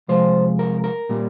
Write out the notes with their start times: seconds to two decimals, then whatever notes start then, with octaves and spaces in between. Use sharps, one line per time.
0.08 C3 F3 G#3 C5
0.59 A#4
0.84 A#4
1.09 A#2 G3 A#3